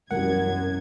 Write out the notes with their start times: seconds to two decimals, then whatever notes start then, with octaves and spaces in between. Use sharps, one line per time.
0.11 E1 C2 F#2 G4 A#4 F#5 G#6